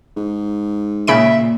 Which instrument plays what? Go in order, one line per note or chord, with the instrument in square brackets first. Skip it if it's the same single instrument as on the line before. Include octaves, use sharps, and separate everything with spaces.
[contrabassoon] G#2
[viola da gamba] A#2 [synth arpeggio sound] C#3 B5 D7 [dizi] E5